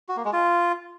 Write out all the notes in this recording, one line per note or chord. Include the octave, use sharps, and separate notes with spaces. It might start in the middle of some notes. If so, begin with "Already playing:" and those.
F#4
A#3
G#3
F4